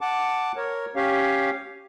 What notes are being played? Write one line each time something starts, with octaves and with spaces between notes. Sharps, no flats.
F#5 A5 D6
A#4 C#5
C#4 G4 C#5 F5